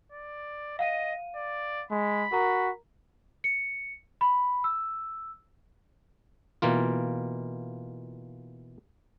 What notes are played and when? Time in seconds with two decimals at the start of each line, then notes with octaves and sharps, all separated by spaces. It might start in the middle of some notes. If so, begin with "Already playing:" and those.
0.12 D5
0.79 D#5 F5 F#5 D#7
1.36 D5
1.91 G#3 B5
2.32 F#4 A#4 A#5
3.44 C#7
4.21 B5
4.64 E6
6.62 B2 E3 A#3 F4